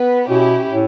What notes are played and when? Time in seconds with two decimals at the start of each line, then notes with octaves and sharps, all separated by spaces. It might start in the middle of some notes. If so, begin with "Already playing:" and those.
Already playing: B3 B4
0.29 B2 C#4 E4 G4
0.71 A2